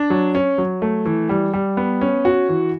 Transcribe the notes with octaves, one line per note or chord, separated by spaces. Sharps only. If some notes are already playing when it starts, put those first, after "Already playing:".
Already playing: D4
F#3
C#4
F#3
A3
E3
G3
G3
B3
C#4
F#4
E3